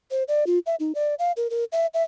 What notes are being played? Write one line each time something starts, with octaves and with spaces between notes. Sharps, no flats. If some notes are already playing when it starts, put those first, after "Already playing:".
C5
D5
F4
E5
D#4
D5
F5
A#4
A#4
E5
E5